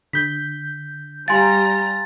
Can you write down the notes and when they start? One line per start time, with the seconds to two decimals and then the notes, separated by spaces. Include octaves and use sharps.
0.13 D3 G6 B6
1.28 G3 F5 G#5 A#5 C6 A6